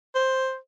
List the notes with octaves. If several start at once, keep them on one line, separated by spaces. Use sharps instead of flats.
C5